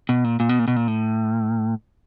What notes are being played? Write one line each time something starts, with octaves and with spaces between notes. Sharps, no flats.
B2
A#2
A#2
B2
A#2
B2
A#2
A2